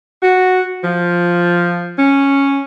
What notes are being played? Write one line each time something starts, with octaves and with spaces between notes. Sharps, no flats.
F#4
F3
C#4